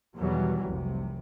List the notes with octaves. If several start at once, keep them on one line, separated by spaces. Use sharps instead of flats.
E2 B2 D#3 E3 F#3 G3
F1 C2 C3